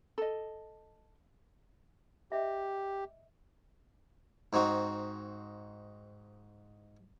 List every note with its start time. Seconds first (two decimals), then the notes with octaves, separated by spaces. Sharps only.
0.18 A4 D#5
2.32 G4 D#5 E5
4.53 G#2 C4 D#4 F#4